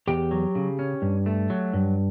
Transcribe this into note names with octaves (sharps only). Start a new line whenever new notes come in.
E2 G4 G5
F#3
C#3
C#4
G2
A3
F#3
G2